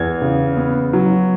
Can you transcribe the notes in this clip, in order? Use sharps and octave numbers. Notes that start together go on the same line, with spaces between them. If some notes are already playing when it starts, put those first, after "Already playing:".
Already playing: E2 G#6
C#3
B3
F#3